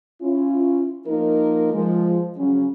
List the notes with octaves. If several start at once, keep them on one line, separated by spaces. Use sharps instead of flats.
C#4 E4 F4
F3 A#3 D#4 A#4
F3 G#3
C#3 F#3 C#4